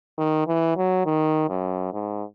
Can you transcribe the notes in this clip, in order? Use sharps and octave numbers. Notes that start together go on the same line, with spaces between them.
D#3
E3
F#3
D#3
F#2
G#2